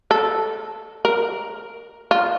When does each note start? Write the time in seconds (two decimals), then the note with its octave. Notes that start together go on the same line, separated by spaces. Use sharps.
0.11 A4
1.05 A#4
2.11 F4